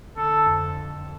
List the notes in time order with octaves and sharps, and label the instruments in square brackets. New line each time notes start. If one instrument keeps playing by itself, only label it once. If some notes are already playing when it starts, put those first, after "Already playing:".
[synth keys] D3 [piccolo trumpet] A4
[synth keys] F2